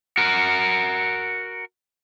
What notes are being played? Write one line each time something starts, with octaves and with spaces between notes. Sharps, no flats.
F#4 A#4